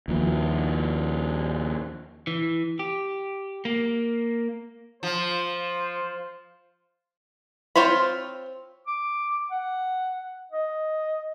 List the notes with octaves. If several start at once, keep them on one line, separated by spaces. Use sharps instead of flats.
D#2 F3
E3
G4
A#3
F3 C5
C4 F4 C5 C#5 B5
D6
F#5
D#5